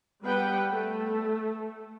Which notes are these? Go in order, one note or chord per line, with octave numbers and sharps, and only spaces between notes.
G3 B3 B4 F#5 G5
A3